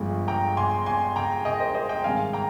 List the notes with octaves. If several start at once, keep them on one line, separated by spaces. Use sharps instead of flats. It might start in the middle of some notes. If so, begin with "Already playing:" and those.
Already playing: G1 G2 D3 F3 G#3
G5 A#5
G#5 C6
G#5 C6
G5 A#5
D#5 G5
C5 D#5
C5 D#5
D#5 G5
G#1 G2 D#3 G#3 F5 G#5
G5 A#5